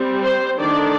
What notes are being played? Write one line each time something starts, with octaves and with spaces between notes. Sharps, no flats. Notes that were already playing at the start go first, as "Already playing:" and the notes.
Already playing: G3 C4
C5
D#3 A3 D4 D5